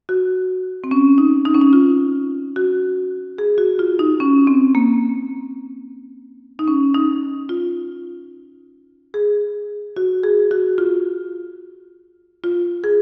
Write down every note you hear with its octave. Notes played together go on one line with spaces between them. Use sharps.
F#4
C4
C#4
D#4
D#4
C#4
D#4
F4
F#4
G#4
F#4
F4
D#4
C#4
C4
A#3
D#4
C#4
D#4
F4
G#4
F#4
G#4
F#4
F4
F4
G#4